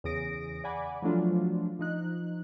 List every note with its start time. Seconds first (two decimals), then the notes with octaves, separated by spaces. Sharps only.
0.04 E2 C#3 G#4 D#6 A#6 D7
0.64 D5 F#5 G#5 B5 D6
1.02 F3 F#3 A3 D4 F4
1.79 F3 D#4 F#6